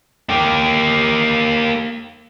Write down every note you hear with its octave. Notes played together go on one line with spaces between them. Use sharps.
A#3 G4